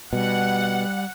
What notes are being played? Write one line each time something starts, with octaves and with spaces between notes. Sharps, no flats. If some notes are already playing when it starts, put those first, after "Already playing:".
B2 G3 F#5